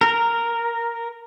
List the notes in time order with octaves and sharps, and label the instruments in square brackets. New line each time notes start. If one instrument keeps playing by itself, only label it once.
[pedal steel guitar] A#4